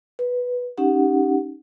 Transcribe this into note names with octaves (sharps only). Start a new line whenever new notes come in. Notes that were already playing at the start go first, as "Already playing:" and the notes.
B4
C#4 D#4 G4 F#5